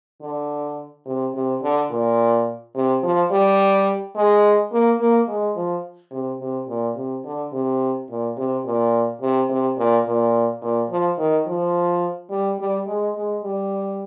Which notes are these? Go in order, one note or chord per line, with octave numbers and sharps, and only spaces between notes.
D3
C3
C3
D3
A#2
C3
F3
G3
G#3
A#3
A#3
G#3
F3
C3
C3
A#2
C3
D3
C3
A#2
C3
A#2
C3
C3
A#2
A#2
A#2
F3
D#3
F3
G3
G3
G#3
G#3
G3